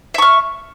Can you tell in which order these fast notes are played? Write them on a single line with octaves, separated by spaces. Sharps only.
E5 C#6 F6